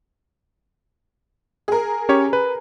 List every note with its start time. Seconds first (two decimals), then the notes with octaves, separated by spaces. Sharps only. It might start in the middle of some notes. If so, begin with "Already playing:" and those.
1.68 G#4 A#4
2.09 C#4 G4 C#5
2.33 B4